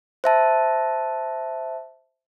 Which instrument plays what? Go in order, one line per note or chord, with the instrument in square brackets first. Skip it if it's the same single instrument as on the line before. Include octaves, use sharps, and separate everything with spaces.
[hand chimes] C5 E5 A5